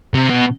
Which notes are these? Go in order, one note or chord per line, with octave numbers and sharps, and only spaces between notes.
C3
B2